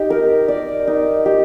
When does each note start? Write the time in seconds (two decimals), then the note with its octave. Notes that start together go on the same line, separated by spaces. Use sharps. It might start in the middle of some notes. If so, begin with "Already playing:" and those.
Already playing: D#4 G4
0.10 A#4
0.48 D5
0.87 D#4
1.26 G4